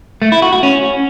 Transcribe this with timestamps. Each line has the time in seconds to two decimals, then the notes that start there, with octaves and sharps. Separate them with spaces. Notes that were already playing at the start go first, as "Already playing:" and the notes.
0.22 A3
0.32 E4
0.42 F#4
0.53 F#4
0.63 C#4